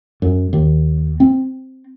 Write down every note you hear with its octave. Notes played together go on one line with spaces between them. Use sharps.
F#2
D#2
C4